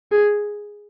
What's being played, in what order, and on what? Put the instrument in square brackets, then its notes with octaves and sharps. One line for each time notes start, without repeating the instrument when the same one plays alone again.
[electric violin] G#4